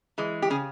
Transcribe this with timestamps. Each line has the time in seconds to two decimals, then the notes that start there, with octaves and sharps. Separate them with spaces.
0.18 E3 G#3
0.42 G4
0.50 C#3 G#4